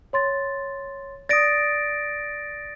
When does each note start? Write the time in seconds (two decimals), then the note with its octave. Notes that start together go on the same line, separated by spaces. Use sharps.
0.13 C#5 C6 A6
1.29 D5 D#6 A6 A#6 D7